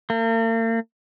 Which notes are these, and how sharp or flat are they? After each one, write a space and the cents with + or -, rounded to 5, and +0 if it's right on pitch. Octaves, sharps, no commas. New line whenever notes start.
A#3 -45